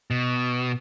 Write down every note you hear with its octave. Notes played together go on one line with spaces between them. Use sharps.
B2